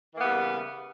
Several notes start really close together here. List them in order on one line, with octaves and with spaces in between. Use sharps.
E3 A#3 B3 G3 C#3